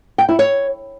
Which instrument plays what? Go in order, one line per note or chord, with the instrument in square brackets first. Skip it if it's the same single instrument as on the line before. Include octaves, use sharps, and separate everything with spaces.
[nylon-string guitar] G5
E4
C#5